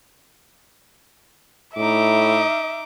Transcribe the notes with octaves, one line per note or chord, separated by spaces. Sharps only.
A2 D#4 E5 D6